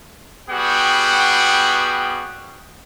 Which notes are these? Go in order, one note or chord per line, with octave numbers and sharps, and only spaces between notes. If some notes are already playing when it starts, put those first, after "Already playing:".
G3 B3 F#4 G#4 F#5 G5